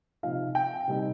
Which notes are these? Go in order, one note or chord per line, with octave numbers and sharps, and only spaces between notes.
C3 F3 D#4 F5
G5
C3 G3 C4 D#4